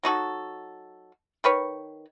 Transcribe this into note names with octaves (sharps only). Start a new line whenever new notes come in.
F#3 D#4 F#4 A4
D#3 B4 C#5